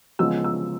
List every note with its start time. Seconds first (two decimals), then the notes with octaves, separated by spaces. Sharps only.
0.19 C#3 F3 G#3 B3 E6
0.44 E6